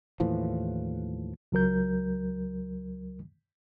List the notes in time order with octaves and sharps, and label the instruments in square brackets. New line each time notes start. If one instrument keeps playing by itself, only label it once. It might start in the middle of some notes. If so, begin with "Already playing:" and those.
[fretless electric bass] D#2 A2 E3 F3
[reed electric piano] C#2 F#3 A#4 G6